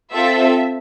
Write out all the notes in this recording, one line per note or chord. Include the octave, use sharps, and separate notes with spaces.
C4 F4 A4 E5